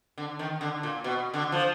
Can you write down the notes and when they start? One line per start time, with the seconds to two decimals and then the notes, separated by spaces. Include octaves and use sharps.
0.18 D3
0.39 D#3
0.61 D3
0.83 A#2
1.04 B2
1.34 D3
1.52 F3